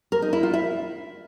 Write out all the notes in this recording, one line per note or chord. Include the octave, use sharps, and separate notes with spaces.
A#4
D#4
E4
F4
E5